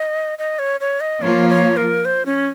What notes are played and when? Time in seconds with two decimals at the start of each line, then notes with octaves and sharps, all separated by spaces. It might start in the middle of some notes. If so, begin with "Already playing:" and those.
Already playing: D#5
0.38 D#5
0.59 C#5
0.80 C#5
1.00 D#5
1.22 F3 A#3 F4 C#5
1.49 C#5
1.77 A#4
2.05 C5
2.26 C#4